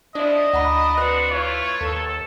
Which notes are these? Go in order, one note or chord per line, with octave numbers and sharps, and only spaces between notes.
F3 D4 E4 D5 D#5
D2 D4 F#5 A#5 B5
C4 D4 F#4 B4 F#6
A3 E4 F4 C#5
D#2 A4